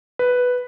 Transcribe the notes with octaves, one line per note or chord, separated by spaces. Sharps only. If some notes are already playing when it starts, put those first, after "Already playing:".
B4